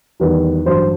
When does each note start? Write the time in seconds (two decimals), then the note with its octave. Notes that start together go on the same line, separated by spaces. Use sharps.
0.20 E2 D#3 G3 B4
0.66 A1 G2 F#3 C5